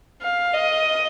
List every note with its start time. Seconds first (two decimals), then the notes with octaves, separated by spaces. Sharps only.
0.22 F5
0.54 D#5